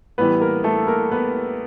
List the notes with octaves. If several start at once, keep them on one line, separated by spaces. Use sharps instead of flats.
A2 E3 G3 B3 B4
A#3 A#4
A3 A4
A#3 A#4
B3 B4